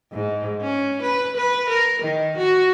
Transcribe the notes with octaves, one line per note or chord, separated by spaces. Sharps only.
G#2
C#4
B4
B4
A#4
D#3
F#4